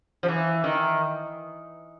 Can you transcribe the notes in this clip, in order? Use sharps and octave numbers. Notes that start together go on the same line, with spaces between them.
F3
E3
D#3